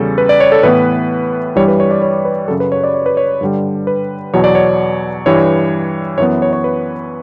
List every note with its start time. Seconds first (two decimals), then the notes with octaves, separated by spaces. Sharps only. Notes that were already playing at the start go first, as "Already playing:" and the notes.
Already playing: E2 C#3 G3 C#4 A4
0.18 B4
0.29 D5
0.40 C#5
0.52 A4
0.63 A2 E3 B3 B4
1.56 G2 E3 G3 C#5
1.68 B4
1.80 C#5
1.91 D5
2.02 C#5
2.25 B4
2.48 F#2 C#3 F#3 A4
2.60 B4
2.72 C#5
2.83 D5
2.94 C#5
3.06 B4
3.17 C#5
3.41 G2 D3 G3
3.87 B4
4.34 E2 B2 F#3 C#5
4.44 D5
4.55 C#5
5.26 G2 E3 G3 C#5
6.18 F#2 E3 B3 C#5
6.42 C#5
6.53 C#5
6.64 B4